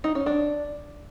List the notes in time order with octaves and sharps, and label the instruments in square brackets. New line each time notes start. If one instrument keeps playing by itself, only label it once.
[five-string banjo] D#4
C#4
D4